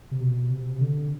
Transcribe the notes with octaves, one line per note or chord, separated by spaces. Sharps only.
C3
B2
C3
D3